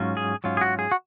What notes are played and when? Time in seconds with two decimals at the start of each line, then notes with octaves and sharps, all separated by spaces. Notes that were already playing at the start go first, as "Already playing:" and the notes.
Already playing: G#2 F#3 C#4 F4
0.17 G#4
0.44 G#2 F#3 C#4 F4
0.57 G#4
0.61 F#4
0.79 G#4
0.92 F#4